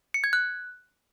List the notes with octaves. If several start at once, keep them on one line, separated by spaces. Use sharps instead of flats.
C#7
G#6
F#6